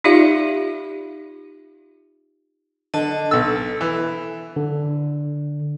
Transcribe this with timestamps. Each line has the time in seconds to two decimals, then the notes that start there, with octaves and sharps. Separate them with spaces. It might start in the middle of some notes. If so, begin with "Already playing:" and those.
0.04 D#4 F4 G4 D5 E5 F5
2.94 D3 D#5 A5
3.31 B1 A4 E6
3.81 E3
4.56 D3